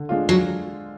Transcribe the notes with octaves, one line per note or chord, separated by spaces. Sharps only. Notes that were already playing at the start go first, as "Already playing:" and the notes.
Already playing: D3
G#3 D4 F4
F#3